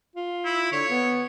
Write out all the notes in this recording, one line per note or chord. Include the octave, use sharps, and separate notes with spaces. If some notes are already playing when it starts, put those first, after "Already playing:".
F4
E4
D3 C#5
B3